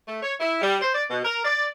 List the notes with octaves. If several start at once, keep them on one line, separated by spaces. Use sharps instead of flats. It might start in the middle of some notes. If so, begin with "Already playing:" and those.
A3
C#5
E4
G3
C5
D5
B2
A#4
D5